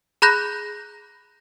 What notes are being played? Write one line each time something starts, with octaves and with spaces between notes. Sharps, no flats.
G#4 A#5 B5 F#6 G6 A#6